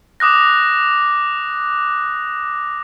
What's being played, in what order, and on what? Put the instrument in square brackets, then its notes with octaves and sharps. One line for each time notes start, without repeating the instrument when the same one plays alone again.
[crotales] D6 D#6 F#6 A#6